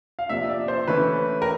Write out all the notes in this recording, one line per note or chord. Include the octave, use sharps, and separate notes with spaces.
F5
C3 F3 A#3 D4 E5
D5
C5
E3 A3 C#4 E4 B4
A#4